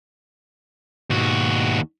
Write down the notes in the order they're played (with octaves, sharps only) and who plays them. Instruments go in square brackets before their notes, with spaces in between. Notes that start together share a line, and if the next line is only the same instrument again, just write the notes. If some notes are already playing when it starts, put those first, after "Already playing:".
[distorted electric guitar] D#2 F#4 [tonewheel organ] G#2 B2